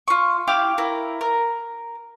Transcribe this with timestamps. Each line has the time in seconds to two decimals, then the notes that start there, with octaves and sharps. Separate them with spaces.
0.08 F4 C#6
0.47 E4 G4 F5 D6
0.78 E4 A#4
1.21 A#4